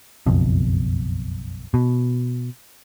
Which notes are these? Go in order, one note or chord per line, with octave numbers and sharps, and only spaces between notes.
F#1 B1 F2
B2